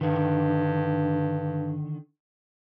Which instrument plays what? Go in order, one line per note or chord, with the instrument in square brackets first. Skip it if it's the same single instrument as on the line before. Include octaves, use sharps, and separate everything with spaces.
[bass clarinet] G2 [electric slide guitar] D3 D#3